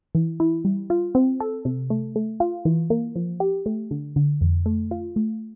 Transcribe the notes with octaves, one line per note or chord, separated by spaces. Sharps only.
E3
E4
G3
F4
C4
A4
C3
A3
A3
F4
E3
A#3
F3
G4
A3
D3
D3
F2
A3
F4
A3